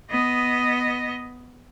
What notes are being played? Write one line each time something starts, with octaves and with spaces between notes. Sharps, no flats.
B3 D#5